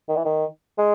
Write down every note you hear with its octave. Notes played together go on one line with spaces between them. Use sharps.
D#3
E3
D#3
G#3